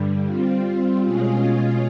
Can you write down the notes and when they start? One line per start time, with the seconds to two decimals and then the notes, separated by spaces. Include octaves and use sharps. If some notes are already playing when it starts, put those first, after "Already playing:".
Already playing: G2 D3 G3
0.27 G3 C4 F4
1.03 B2 G#3 C#4 F4 G#4